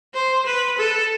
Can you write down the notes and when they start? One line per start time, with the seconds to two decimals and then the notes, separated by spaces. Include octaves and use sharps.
0.15 C5
0.46 B4
0.78 A4